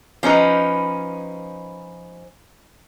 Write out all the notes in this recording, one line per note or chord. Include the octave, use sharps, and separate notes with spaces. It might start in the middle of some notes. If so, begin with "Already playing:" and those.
F3 C#4 D#4 B4